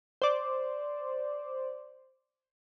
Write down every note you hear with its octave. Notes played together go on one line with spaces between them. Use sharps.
C5 D5